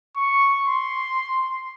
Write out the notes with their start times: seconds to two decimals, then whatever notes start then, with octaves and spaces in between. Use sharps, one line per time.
0.17 C#6
0.68 C6